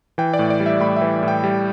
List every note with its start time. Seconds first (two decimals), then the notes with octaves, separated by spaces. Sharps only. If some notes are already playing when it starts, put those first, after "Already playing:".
0.18 E3 G5
0.34 D5
0.39 A2
0.50 D5
0.60 G3
0.66 E5
0.80 A2 B5
0.96 E3 E5
1.23 A2
1.28 G5
1.44 G3